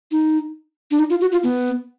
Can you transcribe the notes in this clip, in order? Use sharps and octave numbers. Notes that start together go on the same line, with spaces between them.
D#4
D4
D#4
F4
F#4
F4
B3